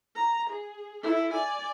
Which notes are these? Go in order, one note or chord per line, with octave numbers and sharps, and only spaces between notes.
A#5
G#4
E4 A4
D5 G#5